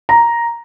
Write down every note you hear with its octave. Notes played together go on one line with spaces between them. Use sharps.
A#5